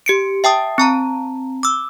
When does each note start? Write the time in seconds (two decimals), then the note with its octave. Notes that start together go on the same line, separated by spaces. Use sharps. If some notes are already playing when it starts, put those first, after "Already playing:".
0.06 G4 C#7 D7
0.44 E5 G5 A5 D#6
0.78 C4 A5 A#5
1.63 D6 E6